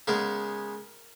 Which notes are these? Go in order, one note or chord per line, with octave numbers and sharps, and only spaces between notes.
C#3 G#3 B3 A#4